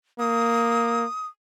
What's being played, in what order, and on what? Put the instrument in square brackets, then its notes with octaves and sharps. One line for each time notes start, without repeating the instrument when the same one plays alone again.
[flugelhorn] A#3 [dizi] D#6